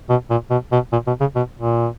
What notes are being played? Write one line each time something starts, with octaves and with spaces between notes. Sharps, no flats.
B2
A#2
B2
B2
A#2
B2
C#3
B2
A#2